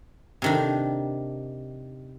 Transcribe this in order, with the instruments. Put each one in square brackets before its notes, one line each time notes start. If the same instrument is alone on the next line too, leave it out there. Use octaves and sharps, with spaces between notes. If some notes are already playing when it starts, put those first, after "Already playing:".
[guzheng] C3 D#3 D4